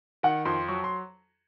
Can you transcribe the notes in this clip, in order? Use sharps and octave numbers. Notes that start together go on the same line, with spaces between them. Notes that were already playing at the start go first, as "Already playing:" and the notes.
D#3 F#5
F2 C6
F#3 C#6
C6